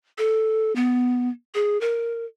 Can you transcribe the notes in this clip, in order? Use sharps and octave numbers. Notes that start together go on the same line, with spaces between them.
A4
B3
G#4
A#4